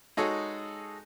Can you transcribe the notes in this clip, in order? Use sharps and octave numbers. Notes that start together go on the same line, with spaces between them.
G#3 D#4 F#4 G#4 A4 C#5